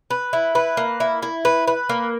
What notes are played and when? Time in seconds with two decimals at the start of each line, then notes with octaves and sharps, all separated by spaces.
0.11 B4
0.33 E4
0.55 B4
0.77 A#3
1.00 E4
1.22 E4
1.45 B4
1.67 B4
1.89 A#3